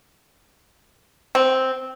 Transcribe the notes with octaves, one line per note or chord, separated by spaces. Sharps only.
C4